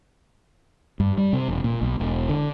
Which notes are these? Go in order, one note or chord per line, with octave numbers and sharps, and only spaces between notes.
G2
G3
C3
E1
A#2
B1
E1
D3